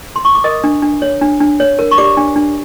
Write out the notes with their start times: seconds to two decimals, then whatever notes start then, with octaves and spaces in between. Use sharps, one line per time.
0.16 C6
0.25 C#6
0.35 D6
0.44 A#4 D#5 D#6
0.64 D4
0.82 D4
1.02 C#5
1.21 D4
1.40 D4
1.60 C#5
1.79 A#4
1.91 C#6
1.98 G4 D5 D6
2.17 D4
2.36 D4